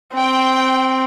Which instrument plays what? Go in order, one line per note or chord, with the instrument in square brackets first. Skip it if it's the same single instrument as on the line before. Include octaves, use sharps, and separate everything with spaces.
[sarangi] C4 [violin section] G5